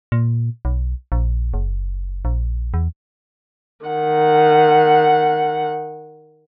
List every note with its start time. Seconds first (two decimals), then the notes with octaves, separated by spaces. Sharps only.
0.12 A#2
0.65 B1
1.12 A#1
1.54 F#1
2.25 A#1
2.74 E2
3.85 D#3 F#5